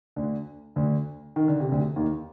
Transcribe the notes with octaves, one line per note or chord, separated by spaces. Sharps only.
D2 D3
D2 D3
D#3
D3
C3
D2 D3
D#2 D#3